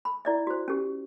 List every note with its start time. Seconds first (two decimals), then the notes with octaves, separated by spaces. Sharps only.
0.05 B5
0.25 E4 D5 E5
0.47 F#4 C5
0.68 C#4 G4